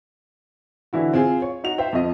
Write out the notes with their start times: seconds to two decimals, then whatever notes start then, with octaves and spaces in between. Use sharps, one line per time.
0.93 D3 E3 E4 F#4
1.13 C4 F4 G#4
1.42 C#5
1.64 D#4 F#4 F7
1.78 C5 E5 G5
1.93 F2 F3 D#5